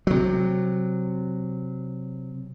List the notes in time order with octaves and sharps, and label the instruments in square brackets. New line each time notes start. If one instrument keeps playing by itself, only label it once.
[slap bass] C3 F#3